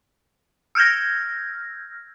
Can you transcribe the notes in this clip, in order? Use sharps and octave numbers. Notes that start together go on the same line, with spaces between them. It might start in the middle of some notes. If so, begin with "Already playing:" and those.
E6 F6 G6 G#6 A#6